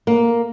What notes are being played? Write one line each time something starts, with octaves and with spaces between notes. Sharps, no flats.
A#3